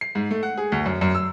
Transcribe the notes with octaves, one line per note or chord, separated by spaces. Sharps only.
C7
G#2
A3
F#5
G#4
D2
F#2
F#2
E6